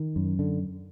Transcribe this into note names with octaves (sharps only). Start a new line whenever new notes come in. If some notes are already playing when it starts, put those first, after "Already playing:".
Already playing: D#3
F#2
D3